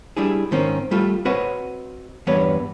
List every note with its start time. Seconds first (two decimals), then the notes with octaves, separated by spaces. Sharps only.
0.17 G3 D4 E4 G#4
0.51 G#2 D#3 C4 C#4
0.91 G3 A3 F4
1.25 C4 F#4 B4 C#5 D#5 F#5
2.27 E2 G2 B3 B4 C#5